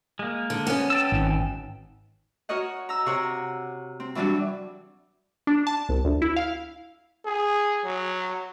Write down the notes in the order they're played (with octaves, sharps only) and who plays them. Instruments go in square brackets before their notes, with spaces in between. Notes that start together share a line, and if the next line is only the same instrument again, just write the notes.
[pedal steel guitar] G#3 A#3
[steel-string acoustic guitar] D3
B3 C#4
[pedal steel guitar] G5 A5 E6
[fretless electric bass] G#1
[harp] F#4 A#4 C#5 D#5 F#5
A#5 E6
C3 C#5 F#5 A#5
C4
E3 F#3 G3 D4 F#4
[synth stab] D4
A5
C2
D2
E4
F5
[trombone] G#4
F#3